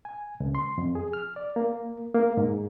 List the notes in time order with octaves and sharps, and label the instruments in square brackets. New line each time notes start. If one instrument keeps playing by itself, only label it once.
[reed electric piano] G#5
C#2
C6
F2
G#4
F6
D5
A#3
A#3
G#2